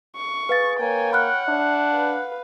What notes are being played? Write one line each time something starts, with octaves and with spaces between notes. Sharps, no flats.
C#6
G#4 B4 F5 A6
A#3 C#5 G5 G#5
F#5 B5 F6 F#6
D4 E5
B4 F5